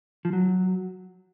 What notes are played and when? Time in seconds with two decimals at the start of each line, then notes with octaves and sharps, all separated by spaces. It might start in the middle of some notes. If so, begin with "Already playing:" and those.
0.25 F3
0.33 F#3